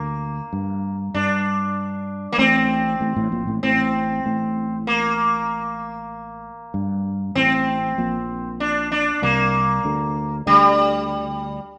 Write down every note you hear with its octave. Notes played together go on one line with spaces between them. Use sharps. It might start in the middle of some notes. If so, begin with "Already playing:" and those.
Already playing: D2 D3 A#3
G2
G2 D4
A#3
A1 A2 C4
A1 A2
A1 A2
A#1 A#2
A1 A2
A1 A2 C4
A1 A2
A#3
G2
A1 A2 C4
A#1 A#2
D4
D4
C2 C3 A#3
D2 D3
D2 D3 G3